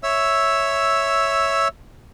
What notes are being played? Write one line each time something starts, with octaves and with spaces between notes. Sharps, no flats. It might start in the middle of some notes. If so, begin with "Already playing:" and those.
C#5 E5 E6